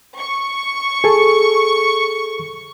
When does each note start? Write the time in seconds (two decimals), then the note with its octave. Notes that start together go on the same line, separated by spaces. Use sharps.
0.18 C#6
1.04 G#4 A4